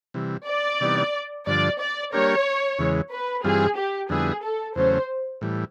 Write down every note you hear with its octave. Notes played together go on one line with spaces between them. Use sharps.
C3 E3 G3
D5
C3 E3 G3 B3 D#4
G2 D3 F3 D5
D5
G3 A#3 D4 G4 A#4 C#5
E2 C#3 E3 G#3
B4
G2 E3 G3 C4 F4 G#4
G4
F2 D3 G3 B3 E4 G#4
A4
E2 C#3 F#3 A3 C#4 C5
A2 E3 G3